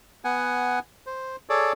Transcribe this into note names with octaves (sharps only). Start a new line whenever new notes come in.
B3 F#5 G#5
C5
G#4 A4 C#5 D5